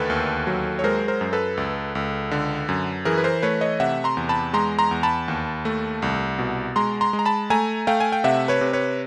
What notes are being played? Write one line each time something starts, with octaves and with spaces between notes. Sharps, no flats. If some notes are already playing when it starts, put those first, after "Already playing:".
Already playing: D2 D#3 A4 B4
D#2
F#3
C#5
G#3 A#4 C5
A#4 C5
F#2
A4 B4
C#2
C#2
D3
F#2
E3 G#4 A#4
B4
A#4 C5
A3 B4 C#5
C#5 D#5
C3 E5 F#5
A#5 C6
E2
A5 B5
G#3 A#5 C6
A#5 C6
E2
A5 B5
D#2
A3
C2
B2
G#3 A#5 C6
A#5 C6
G#3
A#5
A5 B5
A3 G#5 A#5
A3 F5 G5
G#5
G5
C3 E5 F#5
B4 C#5
C3
B4 C#5